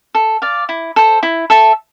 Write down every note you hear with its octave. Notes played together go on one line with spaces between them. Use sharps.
A4
D5 F5
E4
A4 C5
E4
A4 E5 A5